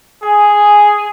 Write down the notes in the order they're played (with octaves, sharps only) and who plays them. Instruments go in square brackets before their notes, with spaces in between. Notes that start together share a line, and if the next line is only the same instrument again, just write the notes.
[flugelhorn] G#4 [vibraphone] G#5